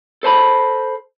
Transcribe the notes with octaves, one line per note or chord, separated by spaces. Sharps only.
A4 C5 A5 B5